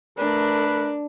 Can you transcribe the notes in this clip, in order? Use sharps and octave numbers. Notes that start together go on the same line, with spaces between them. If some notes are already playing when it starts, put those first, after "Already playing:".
A3 D4 A#4 B4